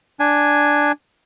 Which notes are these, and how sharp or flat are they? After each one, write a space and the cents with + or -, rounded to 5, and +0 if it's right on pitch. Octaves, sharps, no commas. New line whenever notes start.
D4 +0 G#5 +0